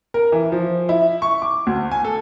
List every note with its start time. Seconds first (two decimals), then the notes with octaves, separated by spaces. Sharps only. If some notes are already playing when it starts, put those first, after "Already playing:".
0.14 A#4
0.32 E3
0.52 F3
0.89 E4
1.22 C#6
1.42 D6
1.67 D2
1.91 G#5
2.04 A4